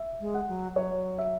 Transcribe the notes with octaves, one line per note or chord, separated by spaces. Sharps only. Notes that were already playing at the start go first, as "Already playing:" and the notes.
Already playing: E5
G#3
F#5
F#3
F#3 C#5
E5